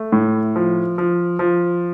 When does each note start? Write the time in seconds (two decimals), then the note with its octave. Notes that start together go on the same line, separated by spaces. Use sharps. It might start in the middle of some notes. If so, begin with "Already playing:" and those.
Already playing: A3
0.12 A2
0.56 F3
0.98 F3
1.39 F3